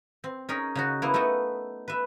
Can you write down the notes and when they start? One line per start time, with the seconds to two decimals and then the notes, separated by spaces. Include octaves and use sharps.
0.24 C4
0.49 C#4 D#4 G#4 A#4
0.75 C#3 D#4 F#4
1.02 A#3 B3 E4
1.14 A3 D#4 B4 E5 F#5
1.88 B4 E5